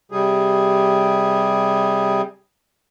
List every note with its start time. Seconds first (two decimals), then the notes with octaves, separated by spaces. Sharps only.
0.12 C3 G3 G#4